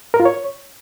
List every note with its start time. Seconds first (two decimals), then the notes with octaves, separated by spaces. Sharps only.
0.14 A#4
0.20 F4
0.25 C#5